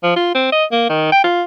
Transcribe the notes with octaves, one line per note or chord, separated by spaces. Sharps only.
F3
F4
C4
D#5
A#3
D#3
G5
F4